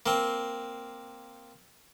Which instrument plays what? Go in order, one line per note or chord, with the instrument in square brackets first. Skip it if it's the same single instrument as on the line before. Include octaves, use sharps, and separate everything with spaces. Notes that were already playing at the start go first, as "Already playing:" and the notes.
[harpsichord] A#3 C4